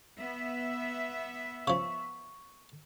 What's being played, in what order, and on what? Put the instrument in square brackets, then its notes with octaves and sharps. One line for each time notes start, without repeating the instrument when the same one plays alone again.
[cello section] B3 E5
[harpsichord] C#3 F3 [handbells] C#6